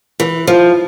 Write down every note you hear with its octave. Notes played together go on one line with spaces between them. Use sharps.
E3
F3